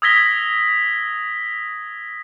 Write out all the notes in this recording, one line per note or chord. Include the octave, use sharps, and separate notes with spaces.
D#6 E6 G#6 A#6 B6 G7